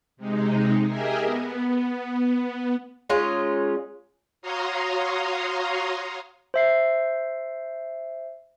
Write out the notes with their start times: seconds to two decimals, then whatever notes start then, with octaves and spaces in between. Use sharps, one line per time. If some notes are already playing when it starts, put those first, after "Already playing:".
0.17 C3 G#3 D#4
0.86 G4 G#4 A#4 D#5 E5 G#5
1.24 B3
3.10 G#3 C#4 D#4 F4
4.42 F#4 C#5 F5 A#5 C6 D#6
6.54 C5 E5 C7